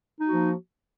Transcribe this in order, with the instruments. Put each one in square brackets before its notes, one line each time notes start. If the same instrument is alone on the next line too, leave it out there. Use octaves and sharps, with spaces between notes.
[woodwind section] D#4
F#4
A#3
F3